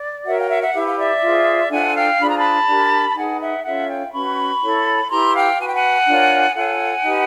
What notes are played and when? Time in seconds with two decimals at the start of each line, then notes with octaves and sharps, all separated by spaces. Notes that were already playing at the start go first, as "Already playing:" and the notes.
Already playing: D5
0.25 F#4 A#4 C#5 E5 F#5
0.38 F5 G5
0.49 E5 F#5
0.61 E5 F#5
0.73 E4 G4 B4 E5
0.86 F5
0.97 D5 E5
1.22 F4 G#4 C5
1.70 D4 F4 A4 C5 F#5 G#5
1.95 F5 G5
2.19 D4 F4 G#4 C5 B5
2.28 A#5
2.36 A5 B5
2.67 D4 G4 A#4
3.09 A5
3.16 D#4 G#4 B4 F#5 G#5
3.40 E5 F#5
3.64 C#4 F4 A4 C#5 E5 F#5
3.88 F5 G5
4.13 C#4 F#4 B4 B5 C#6
4.62 E4 A4 C#5
5.10 E4 G4 B4 A#5 C6
5.35 F5 G5
5.58 F#4 B4 G#5
5.66 G5
5.74 F#5 G#5
6.06 D4 F4 A#4 C#5
6.55 F4 A4 C#5 F#5 G#5
7.03 D#4 G4 B4